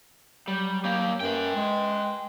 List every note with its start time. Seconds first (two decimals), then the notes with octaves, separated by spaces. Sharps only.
0.48 F#3 G3
0.85 A#3 G4
1.20 F#2 B4 G5
1.55 G#3